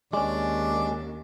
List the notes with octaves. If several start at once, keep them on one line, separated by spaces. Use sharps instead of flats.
D#2 G#3 C#4 D4 D5